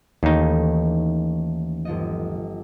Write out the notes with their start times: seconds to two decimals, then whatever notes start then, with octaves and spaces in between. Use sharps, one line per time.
0.23 D#2 E3 A3 C#4 D#4
1.85 G1 F3 D#5